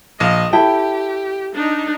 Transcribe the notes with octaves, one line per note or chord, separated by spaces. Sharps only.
A#1 D#5 F5
E4 G4 A4 G5
D4 D#4